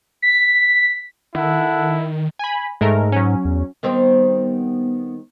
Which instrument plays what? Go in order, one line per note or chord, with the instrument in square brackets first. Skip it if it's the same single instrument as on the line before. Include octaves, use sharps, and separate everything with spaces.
[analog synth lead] B6
[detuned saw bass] D#3 [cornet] E4 [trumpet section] A4 F#5
[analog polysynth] G#5 B5
[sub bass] G#2 [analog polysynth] G#3 A3 A#4
[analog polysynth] F#3 C#4
[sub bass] E2
[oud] D#3 G3 C4 [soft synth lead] B3